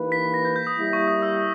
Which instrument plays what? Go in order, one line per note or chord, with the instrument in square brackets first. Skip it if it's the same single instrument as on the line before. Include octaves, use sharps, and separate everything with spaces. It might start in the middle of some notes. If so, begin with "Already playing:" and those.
Already playing: [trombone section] E3 A#3 D#4 G4 B4
[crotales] B6
A#6
G6
G6
D#6
[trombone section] G3 A#3 E4
[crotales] C#6
D#6
E6